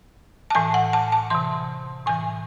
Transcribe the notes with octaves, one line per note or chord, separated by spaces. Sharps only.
A5
A2 E3 G#5
F#5
A5
A5
C3 E3 C6
A2 E3 G#5